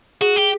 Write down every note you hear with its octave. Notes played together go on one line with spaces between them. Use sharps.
F#4 G#4
G4